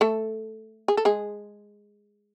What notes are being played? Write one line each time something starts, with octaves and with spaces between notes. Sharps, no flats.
A3 A4
G#4
A4
G#3 G#4